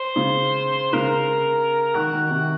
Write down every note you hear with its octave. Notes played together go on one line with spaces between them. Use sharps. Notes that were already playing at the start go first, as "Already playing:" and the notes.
Already playing: C5
C#3
C#3 A#4
D#3 F#4
D#3
C3